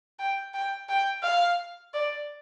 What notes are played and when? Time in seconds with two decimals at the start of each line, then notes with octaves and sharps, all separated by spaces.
0.19 G5
0.54 G5
0.89 G5
1.23 F5
1.94 D5